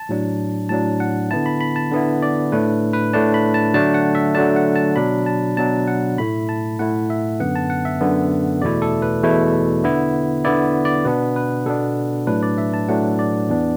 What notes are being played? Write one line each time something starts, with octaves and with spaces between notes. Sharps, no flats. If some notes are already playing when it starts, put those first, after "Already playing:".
Already playing: A5
A2 F#3 D4
A2 F#3 D4 A5
F#5
D3 B3 E4 A5
B5
B5
A5
D3 B3 E4
D5
A2 A3 D4 B4
B4
A2 A3 D4 A5
B5
A5
D3 F#3 A3 D4 A5
F#5
E5
D3 F#3 A3 D4 A5
F#5
A5
B2 F#3 D4 B5
A5
B2 F#3 D4 A5
F#5
A2 A3 E4 B5
A5
A2 A3 E4 F#5
E5
F#2 D3 B3 F#5
A5
F#5
E5
F#2 D3 B3
E2 B2 A3 E4 D5
A4
B4
E2 B2 A3 E4
D3 B3 E4
D3 B3 E4 D5
D5
B2 B3 D4 B4
B4
B2 B3 D4 A4
A2 F#3 A3 D4 B4
D5
E5
A5
A2 F#3 A3 D4 F#5
D5
E2 E3 B3 D4